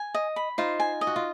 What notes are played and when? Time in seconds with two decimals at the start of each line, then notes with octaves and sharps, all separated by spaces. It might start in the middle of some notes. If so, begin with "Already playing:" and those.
Already playing: G#5
0.14 D#5
0.36 B5
0.58 D#4 F4 C5
0.80 G#5
1.01 D#5
1.07 F#4
1.16 F4